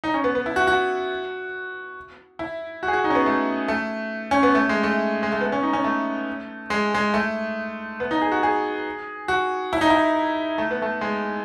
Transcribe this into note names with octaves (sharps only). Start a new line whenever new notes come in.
D#4
C#4
B3
B3
E4
F#4
F#4
E4
F#4
G#4
F#4
D#4
C#4
B3
A3
A3
C#4
B3
A3
G#3
A3
G#3
A3
B3
C#4
D#4
C#4
A3
G#3
G#3
A3
B3
D#4
G#4
F#4
G#4
F#4
E4
D#4
E4
A3
B3
A3
G#3